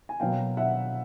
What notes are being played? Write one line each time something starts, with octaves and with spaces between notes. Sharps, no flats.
G#5
B2 F#3 A#3 F5 G5
E5 F#5